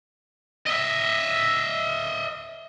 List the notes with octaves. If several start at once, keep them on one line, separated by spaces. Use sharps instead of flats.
D#5 E5